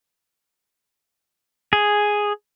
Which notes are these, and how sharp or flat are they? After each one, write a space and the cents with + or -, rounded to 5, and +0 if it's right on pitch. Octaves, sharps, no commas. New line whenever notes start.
G#4 +0